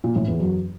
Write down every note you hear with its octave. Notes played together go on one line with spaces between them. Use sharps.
A#2
A2
E2
F#2